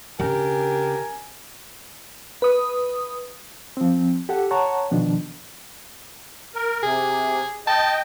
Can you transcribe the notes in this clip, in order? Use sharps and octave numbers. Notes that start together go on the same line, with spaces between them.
C#3 D4 G4 A#4 G#5
B4 D#6
F3 C4
G4 A4 F#5
C#5 F#5 A5 A#5 C#6
B2 D#3 F3 D4
A#4
C3 G#4
D#5 G5 A5